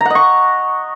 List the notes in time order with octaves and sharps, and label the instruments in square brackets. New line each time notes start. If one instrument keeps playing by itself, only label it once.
[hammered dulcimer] A#5
F#5
D#5
C#6